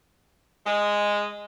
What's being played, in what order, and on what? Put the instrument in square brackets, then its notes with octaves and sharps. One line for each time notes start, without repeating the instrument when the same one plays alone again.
[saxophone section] G#3